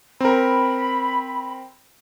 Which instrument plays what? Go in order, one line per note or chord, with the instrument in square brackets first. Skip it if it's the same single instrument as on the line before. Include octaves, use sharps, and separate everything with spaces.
[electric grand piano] C4 A#4 [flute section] B5